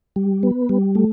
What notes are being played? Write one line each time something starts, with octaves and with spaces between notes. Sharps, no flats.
G3
B3
G3
A3